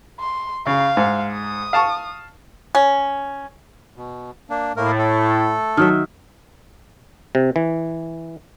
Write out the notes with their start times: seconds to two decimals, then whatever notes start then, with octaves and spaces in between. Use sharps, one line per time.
0.20 C6
0.67 C#3 F5
0.97 G#2
1.33 D#6
1.73 F5 A5 C#6
2.75 C#4
3.96 B2
4.50 A#3 D4
4.76 A2 A3 A#3 A#4
4.98 A3 A4
5.77 D#3 F#3 E5
7.35 C3
7.56 E3